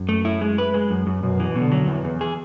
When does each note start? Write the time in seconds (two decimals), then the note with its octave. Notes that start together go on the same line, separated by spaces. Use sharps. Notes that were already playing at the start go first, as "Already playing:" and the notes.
Already playing: F#2
0.09 A3
0.25 E4
0.41 G#3
0.58 B4
0.74 G#3
0.91 F#2
1.07 F#2
1.22 F#2 B2
1.39 E3
1.56 B2 D3
1.72 F#3
1.88 E2 E3
2.04 E2
2.21 G#4